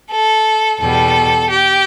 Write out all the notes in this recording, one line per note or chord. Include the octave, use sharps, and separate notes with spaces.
A4
E2 B2 G3 A4
G4